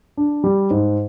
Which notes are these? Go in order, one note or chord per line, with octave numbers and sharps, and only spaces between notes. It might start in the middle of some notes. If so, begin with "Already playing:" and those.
D4
G3
G#2